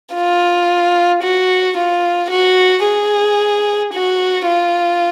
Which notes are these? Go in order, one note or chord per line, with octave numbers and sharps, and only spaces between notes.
F4
F#4
F4
F#4
G#4
F#4
F4